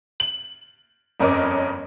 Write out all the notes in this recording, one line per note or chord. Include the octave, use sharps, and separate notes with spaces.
F#7
G1 F2 C#4 A#4 D#5 D6